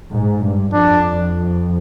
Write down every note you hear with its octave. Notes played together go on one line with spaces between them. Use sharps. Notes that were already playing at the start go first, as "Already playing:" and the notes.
G#2
G2
F2 D4